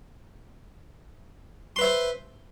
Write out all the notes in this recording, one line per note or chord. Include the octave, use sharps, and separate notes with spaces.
B4 C5 E5 C6